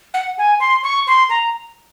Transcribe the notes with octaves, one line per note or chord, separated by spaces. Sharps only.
F#5
G#5
C6
C#6
C6
A#5